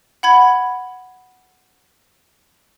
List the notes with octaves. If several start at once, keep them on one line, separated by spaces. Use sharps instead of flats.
F#5 B5 G#6